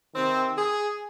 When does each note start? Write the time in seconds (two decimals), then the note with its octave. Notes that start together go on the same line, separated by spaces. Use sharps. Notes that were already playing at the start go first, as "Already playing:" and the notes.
0.13 C3 D#3 C4
0.57 G#4